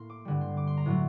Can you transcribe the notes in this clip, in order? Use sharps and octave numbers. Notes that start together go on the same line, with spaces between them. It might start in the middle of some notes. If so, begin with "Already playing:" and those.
Already playing: A2 A#3 A#5 C6
D6
G2 D3 G3
C6
D6
C6
A#5
A2 F#3 A3